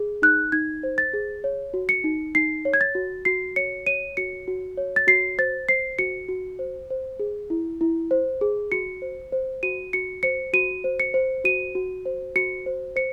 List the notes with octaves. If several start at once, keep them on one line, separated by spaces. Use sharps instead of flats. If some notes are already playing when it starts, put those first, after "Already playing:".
Already playing: G#4
D#4 F#6
D#4 G#6
C5
A6
G#4
C#5
F#4
C#7
D#4
D#4 C7
C#5
G#6
A6
F#4
F#4 C7
C#5 C#7
C#5 D#7
F#4 C#7
F#4
C#5
A6
F#4 C7
C5 A6
C5 C7
F#4 C#7
F#4
C5
C5
G#4
E4
E4
C5
G#4
F#4 C#7
C5
C5
F#4 D#7
F#4 C#7
C5 C#7
F#4 D#7
C5
C#7
C5
F#4 D#7
F#4
C5
F#4 C#7
C5
C5 C#7